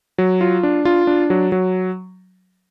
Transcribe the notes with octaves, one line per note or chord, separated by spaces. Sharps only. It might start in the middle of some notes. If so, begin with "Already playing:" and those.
F#3
F4
D4
F4
D4
F#3
F#3